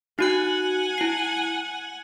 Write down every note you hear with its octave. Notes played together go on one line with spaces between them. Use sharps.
D#4 F#4 F#5 G#5 F#6
E4 C7